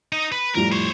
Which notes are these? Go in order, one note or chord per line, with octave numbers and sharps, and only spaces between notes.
D#4
B4
F2 A2 G3 A#4
C5 C#5